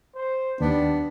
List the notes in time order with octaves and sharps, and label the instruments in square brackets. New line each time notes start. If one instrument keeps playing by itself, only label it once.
[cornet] C5
[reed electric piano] D#2 [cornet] G3 [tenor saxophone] B3 [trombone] D4